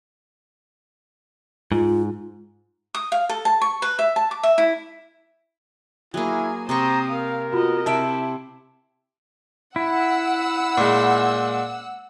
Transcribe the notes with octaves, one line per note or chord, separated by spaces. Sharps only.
G#2 F4
D#6
F5
A4
A5
C#6
B4
E5
A5
D6
E5
E4
F#3 A#3 E4 G#4 G#5
C3 C5 G5 A#5 C#6 D#6
A#4 F5
B3 F4 F#4 D#5
C3 E4 E5 A5 D7
E4 F#5 E6
A#2 G#3